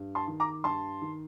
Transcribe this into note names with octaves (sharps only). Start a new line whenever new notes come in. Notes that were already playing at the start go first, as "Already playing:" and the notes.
Already playing: G2
A5 C6
D#3
A#5 D6
G2 A5 C6
D#3